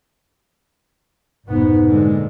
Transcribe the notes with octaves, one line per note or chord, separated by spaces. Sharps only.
F1 G#2 B2 B3
A#2 D3 G#3